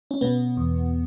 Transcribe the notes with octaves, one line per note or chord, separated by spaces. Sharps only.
C#4
B2 B3
E2